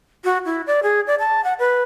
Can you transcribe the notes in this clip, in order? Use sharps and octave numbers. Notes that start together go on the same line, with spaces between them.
F#4
E4
D5
G#4
D5
A5
F#5
B4